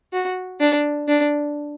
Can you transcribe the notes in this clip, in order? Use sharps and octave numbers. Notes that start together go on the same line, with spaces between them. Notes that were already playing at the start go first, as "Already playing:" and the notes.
F#4
D4
D4